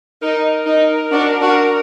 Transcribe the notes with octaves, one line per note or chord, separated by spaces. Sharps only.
D#4 A#4
D#4
D4 F#4
D4 F#4